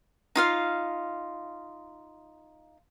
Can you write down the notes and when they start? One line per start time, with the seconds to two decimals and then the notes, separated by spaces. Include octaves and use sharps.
0.35 D#4 F4 F5